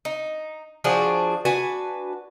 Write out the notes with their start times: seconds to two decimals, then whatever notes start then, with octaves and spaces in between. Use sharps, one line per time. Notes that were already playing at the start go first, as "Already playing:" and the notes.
0.05 D#4
0.84 F3 D4 F#4 G#4
1.45 D4 F#4 B4 G#5